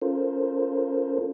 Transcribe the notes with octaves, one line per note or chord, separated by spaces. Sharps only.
C#4 F4 A4 A#4 C5